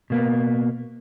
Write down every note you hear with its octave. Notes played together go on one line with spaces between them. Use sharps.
B2 A#3 B3